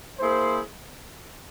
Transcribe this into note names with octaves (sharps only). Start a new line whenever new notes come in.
A#3 E4 G#4 C5